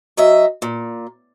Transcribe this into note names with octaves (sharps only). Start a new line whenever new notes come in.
F#3 D#5 E5
A#2